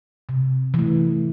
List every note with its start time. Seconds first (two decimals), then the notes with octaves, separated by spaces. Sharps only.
0.29 C3
0.74 E3 A3